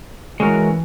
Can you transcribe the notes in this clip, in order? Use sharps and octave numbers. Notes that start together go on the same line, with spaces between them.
E3 G#3 C#4 F#4 A#4